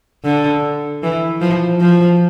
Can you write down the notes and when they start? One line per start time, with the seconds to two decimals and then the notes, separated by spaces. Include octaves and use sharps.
0.24 D3
1.03 E3
1.41 F3
1.81 F3